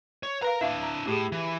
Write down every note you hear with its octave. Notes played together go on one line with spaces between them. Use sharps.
C#5
A#4 B4 F5 A#5
D4 E4 E5 F5
A#5
A2 G4 G#4
E3